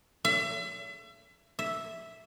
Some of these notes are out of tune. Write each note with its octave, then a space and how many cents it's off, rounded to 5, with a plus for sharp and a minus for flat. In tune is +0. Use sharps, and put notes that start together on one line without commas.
E5 +35
E5 +0